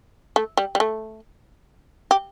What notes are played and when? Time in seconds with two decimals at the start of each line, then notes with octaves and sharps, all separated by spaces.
0.36 A3
0.57 G3
0.75 G3
0.80 A3
2.11 G4